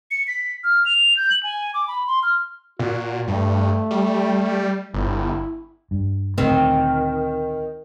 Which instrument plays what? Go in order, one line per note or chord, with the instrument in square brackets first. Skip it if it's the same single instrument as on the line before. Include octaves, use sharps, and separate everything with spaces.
[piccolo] C#7
B6
F6
F7
G6
F#7
G#5
D6
B5
C6
F6
[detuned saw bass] A#2 [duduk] F#4
[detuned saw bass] G2 [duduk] A3
[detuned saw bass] G3
[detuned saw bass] G1 [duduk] E4
[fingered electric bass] G2
[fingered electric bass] D2 A#2 A3 [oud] D#3 C4